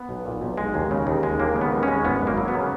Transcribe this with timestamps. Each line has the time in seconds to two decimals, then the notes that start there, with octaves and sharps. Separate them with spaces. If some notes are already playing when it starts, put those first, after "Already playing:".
Already playing: B3
0.09 B1
0.25 A#2
0.41 B1
0.58 G#3
0.74 D#2
0.91 C#3
1.07 D#2
1.23 G#3
1.40 D#2 A#3
1.56 C#3
1.61 B3
1.72 D#2
1.83 C#4
1.88 G#3
2.05 G#1 B3
2.21 F#2
2.27 A#3
2.38 F#3
2.48 B3
2.54 C#3